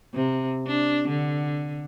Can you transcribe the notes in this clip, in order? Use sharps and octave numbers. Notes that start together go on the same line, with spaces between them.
C3
D4
D3